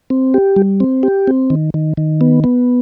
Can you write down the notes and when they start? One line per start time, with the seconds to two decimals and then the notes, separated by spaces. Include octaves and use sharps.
0.10 C4
0.34 G4
0.56 G3
0.80 C4
1.03 G4
1.27 C4
1.50 D#3
1.74 D#3
1.97 D#3
2.21 B3
2.44 B3